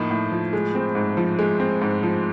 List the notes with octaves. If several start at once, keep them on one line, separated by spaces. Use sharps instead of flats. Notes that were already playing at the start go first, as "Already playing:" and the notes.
Already playing: A2 F3 A#3 D#4
A2
F3
G#3
C4
G#2
F3
G#3
C4
G#2
F3